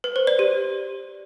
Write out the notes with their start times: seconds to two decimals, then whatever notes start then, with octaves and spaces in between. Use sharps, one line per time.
0.04 B4
0.16 C5
0.27 D5
0.39 G4